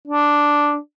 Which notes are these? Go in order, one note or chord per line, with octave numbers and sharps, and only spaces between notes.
D4